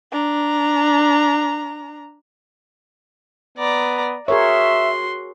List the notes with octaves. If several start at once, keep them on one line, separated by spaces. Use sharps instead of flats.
D4 A#5
B3 D5 A#5
F#4 G#4 A#4 C#5 E5 C6